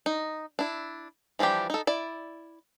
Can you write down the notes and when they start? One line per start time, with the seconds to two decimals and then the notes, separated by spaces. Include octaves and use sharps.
0.06 D#4
0.59 D4 E4
1.39 E3 F3 G3 D4 G4
1.70 D#4 A4
1.87 E4 D5